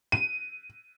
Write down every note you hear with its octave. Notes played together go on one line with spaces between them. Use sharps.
D#7